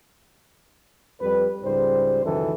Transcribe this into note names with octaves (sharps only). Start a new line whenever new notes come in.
F2 G3 B4
C#2 G#2 G3 C5
C#2 F#2 D#3 E3 A4